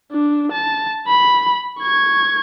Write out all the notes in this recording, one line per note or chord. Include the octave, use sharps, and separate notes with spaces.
D4
A5
B5
C#6 G#6